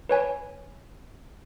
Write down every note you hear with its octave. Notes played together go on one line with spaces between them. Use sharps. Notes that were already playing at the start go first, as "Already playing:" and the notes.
B4 C#5 G#5